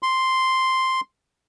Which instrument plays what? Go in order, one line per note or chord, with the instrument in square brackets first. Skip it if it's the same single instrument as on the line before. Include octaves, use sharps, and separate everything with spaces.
[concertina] C6